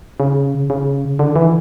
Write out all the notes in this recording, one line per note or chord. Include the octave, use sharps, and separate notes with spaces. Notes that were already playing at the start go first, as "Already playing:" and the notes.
C#3
C#3
D3
E3